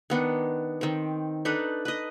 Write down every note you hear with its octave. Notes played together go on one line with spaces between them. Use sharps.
D#3 B3 D4
D#3 C4
D4 D#4 A4 B4
B4 D#5